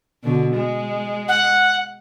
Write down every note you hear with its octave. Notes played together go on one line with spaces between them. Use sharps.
B2 D3
G#3
F#5